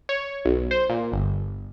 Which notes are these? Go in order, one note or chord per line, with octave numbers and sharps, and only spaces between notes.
C#5
B1
C5
A#2
G1